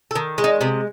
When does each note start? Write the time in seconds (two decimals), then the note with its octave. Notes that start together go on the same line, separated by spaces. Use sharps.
0.11 A4
0.15 D#3
0.38 G#3
0.44 D#4
0.61 C3 B3